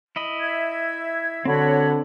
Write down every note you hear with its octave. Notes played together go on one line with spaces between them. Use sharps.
E4 D#5 B5
E5 G#6
D3 C4 D4 F#4 C#5 B5